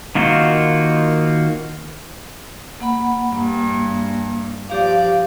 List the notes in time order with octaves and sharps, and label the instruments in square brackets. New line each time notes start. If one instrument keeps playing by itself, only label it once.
[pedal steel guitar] D#3 A#3 F4 F#4 C5
[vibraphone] A#3 F#5 B5
[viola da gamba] G2 [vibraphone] A#3
[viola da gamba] F3 D5 [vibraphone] G4 F5